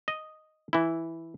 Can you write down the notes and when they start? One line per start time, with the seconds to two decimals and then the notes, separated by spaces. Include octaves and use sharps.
0.08 D#5
0.73 E3 E4